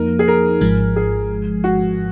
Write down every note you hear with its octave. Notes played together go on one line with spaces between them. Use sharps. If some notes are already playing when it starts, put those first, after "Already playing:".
Already playing: F2 F3 A#3 D#4 A#4
G#4
A#4
G#1 G#2 F3 G#3
G#4
F#4